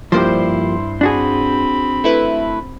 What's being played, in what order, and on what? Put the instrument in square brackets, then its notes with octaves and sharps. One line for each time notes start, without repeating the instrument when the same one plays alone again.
[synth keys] G2 C5 C6 [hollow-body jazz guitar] F3 A#3 G4 [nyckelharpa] E4
[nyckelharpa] C4 B5 [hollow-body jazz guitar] D4 F#4 G#4
[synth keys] A3 E4 B4